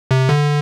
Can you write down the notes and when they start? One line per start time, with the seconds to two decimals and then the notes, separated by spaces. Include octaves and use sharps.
0.11 C3
0.29 D3